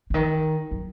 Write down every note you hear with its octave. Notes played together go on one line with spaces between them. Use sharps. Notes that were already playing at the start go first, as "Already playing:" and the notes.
C#3
D#3
F#3